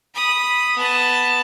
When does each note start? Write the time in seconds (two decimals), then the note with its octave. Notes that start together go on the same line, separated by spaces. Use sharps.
0.15 B5 D#6
0.77 B3 A5